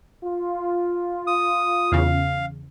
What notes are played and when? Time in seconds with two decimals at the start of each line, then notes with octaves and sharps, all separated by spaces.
0.23 F4
1.27 D#6
1.92 E2 C#3 F5